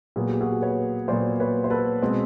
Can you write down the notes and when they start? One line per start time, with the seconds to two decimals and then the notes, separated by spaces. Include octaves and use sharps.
0.16 A#2 F#3 B3 G#4
0.29 G4
0.41 F#4 G#4
0.62 B4 C#5
1.08 A#2 F#3 B3 C5 D5
1.40 B4 C#5
1.64 C5
1.70 A4 B4
2.02 B2 G#3 C4